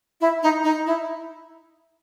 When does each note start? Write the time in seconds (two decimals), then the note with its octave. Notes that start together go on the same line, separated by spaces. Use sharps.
0.21 E4
0.43 D#4
0.64 D#4
0.86 E4